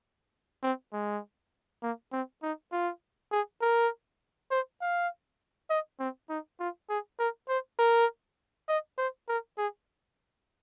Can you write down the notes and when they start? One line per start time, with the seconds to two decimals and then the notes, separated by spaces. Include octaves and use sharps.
0.63 C4
0.93 G#3
1.83 A#3
2.13 C4
2.43 D#4
2.72 F4
3.32 G#4
3.61 A#4
4.51 C5
4.81 F5
5.70 D#5
6.00 C4
6.29 D#4
6.60 F4
6.89 G#4
7.19 A#4
7.49 C5
7.79 A#4
8.68 D#5
8.98 C5
9.28 A#4
9.58 G#4